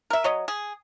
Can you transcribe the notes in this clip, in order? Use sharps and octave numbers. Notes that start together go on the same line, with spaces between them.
A#4 E5
F#3 C#5 D#5
G#4